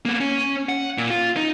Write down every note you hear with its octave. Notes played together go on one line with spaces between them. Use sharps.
A#3 B3
C#4
F#5
A#2
F4
D#4